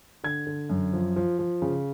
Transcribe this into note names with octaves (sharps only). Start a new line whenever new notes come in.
D3 G#6
D3
F#2
F3
F3
F3
C#3